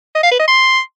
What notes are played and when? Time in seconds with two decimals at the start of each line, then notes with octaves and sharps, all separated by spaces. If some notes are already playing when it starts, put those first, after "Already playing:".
0.15 D#5
0.23 F5
0.31 B4
0.39 D#5
0.48 C6